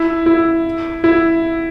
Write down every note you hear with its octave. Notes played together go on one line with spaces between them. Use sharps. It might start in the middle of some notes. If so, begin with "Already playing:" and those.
Already playing: E4
E4
E4